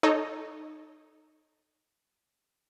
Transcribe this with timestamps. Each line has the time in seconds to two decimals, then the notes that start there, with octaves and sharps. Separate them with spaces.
0.03 D#4 A4 C#5 D#5